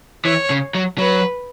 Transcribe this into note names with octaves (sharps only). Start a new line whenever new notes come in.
E3 C#5
C#3
F#3
F#3 B4